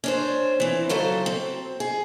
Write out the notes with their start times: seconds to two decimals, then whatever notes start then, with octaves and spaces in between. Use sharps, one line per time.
0.04 C#4 D4 C5
0.60 E3 C4
0.89 C#3 F#3 A4 C5
1.26 C4
1.80 G#4